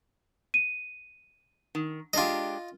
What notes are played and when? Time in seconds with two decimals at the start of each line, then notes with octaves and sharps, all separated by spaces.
0.54 D#7
1.75 D#3
2.13 G#3 D4 F4 G4 D#5